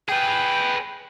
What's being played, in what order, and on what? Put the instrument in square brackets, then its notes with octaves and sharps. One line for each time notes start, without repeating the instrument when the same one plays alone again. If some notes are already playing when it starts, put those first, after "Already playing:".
[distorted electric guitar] G#4 B4 [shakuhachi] G5